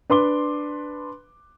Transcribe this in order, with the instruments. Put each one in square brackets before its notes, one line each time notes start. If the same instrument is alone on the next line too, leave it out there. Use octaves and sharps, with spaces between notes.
[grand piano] D4 B4 C6 D6 G7